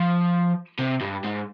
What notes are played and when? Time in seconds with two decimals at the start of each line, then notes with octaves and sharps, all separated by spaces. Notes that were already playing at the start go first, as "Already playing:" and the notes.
Already playing: F3
0.79 C3
1.01 G2
1.24 G#2